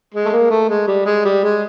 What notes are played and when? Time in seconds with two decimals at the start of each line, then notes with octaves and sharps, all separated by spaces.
0.14 G#3
0.26 A3
0.32 A#3
0.51 A3
0.70 G#3
0.88 G3
1.06 G#3
1.25 G3
1.44 G#3